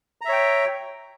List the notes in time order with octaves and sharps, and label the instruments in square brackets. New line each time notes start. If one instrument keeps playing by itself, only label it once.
[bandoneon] A#5
E5
C#5
G5